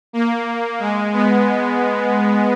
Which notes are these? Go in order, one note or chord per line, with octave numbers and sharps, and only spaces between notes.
A#3
G#3
B3